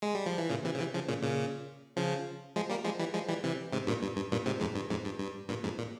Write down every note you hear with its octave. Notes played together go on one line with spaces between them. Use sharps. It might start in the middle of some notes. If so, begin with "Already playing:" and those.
G#3
G3
F3
E3
A#2 C#3
C3 E3
C#3
C3 E3
C#3 F3
A#2 C#3
A#2 C#3
C#3 F3
F3 G#3
G3 A#3
F3 G#3
E3 G3
F3 G#3
E3 G3
C3 E3
G#2 C3
G2 A#2
G2
G2
G2 A#2
G#2 C3
F2 G#2
G2
F2 G#2
G2
G2
G2 A#2
F2 G#2
A#2